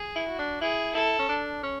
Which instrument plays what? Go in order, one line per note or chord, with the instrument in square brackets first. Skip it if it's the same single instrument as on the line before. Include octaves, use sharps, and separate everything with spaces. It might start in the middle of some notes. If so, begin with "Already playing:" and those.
Already playing: [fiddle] G#4
[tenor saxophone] E4
[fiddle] F#4
[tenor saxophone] D4
[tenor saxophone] E4 [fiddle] G#4
[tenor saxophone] E4 [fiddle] A4
[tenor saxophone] C#4
D4
C#4